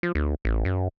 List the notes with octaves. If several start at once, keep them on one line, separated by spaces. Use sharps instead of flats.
F3
D2
A1
F#2